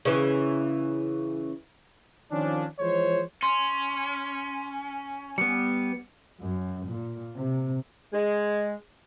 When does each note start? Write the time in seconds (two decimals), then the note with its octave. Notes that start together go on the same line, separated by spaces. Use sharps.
0.05 C#3 E3
2.32 D#3 F3 C#4 D4
2.80 E3 F3 G#3 C5 C#5
3.43 C#4 C6
5.38 G3 B3 C#7
6.41 F#2
6.88 A#2
7.38 C3
8.12 G#3